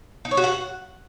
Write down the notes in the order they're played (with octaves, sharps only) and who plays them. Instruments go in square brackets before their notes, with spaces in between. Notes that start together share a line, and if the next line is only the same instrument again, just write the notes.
[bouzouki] D#4
C#5
F#4
F#5